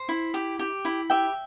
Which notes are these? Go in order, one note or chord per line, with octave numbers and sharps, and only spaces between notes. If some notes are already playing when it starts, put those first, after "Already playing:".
Already playing: C5
E4
G4
G4
E4
G4 E5 G5